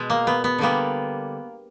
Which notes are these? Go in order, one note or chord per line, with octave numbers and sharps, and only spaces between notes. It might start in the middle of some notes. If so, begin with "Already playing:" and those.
Already playing: B2 G#3
A#3
B3
B3
D3 G3 A#3 B3